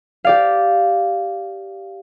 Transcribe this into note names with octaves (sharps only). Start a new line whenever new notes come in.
G4 D5 F5